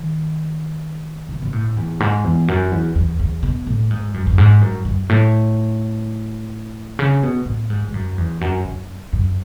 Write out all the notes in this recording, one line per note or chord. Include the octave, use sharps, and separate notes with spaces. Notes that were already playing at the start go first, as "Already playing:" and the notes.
Already playing: D#3
B2
B2
A2
E2
G#2
E2
F#2
E2
E2
E2
B2
A2
G#2
F#2
F#2
G#2
F#2
F#2
A2
C#3
B2
A2
G#2
G#2
F#2
E2
F#2
F#2
F#2